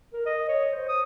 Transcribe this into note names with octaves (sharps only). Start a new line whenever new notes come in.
A#4
D#5
C#5
C5
D#6